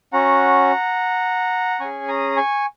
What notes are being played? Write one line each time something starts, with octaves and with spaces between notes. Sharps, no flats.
C#4 F#4 F#5 A#5
C#4 G#4 G#5 C#6
A#5 D#6
G#5 C#6